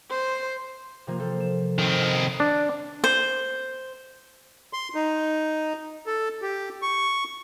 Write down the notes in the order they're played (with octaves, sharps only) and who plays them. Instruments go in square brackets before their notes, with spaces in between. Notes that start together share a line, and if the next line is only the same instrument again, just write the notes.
[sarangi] C5
[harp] C3 F3 A#3
F4 A4 C5
E7
[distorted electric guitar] D#3 C4
[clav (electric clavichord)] D4
[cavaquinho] C5
[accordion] C6
D#4
A4
G4
C#6